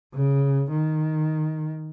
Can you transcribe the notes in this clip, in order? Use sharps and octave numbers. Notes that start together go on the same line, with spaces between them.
C#3
D#3